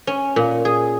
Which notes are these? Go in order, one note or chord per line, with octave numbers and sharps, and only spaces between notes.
C#4
A#2
G#4